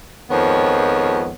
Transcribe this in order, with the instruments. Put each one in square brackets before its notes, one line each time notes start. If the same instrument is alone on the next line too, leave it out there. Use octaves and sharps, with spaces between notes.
[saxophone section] F2 D#3 F3 G#3 B3 C#5